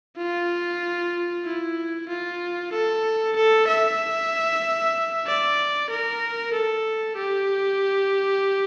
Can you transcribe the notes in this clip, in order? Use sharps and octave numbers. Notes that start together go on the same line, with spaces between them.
F4
E4
F4
A4
A4
E5
D5
A#4
A4
G4